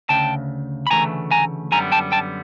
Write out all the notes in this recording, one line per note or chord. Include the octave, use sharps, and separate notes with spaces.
D2 C#3 G5 A5
B5
D2 C#3 E3 A3 G#5 A#5
G#5 A#5
F#2 D3 G3 B3 G#5 A#5
G5 A5
G5 A5